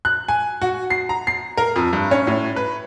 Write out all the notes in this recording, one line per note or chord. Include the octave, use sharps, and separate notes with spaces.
F#6
G#5
F#4
C7
A#5
C7
A#4
F2
G2
C#4
A2
B4